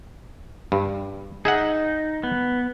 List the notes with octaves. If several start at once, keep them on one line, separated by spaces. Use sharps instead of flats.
G2
D#4 G#4 E5 F#5
B3